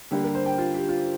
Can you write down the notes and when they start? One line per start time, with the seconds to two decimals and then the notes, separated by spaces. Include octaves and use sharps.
0.11 D3 G3 A#3 G4
0.24 A#4
0.35 C5
0.46 G5
0.58 F4
0.74 G4
0.89 F4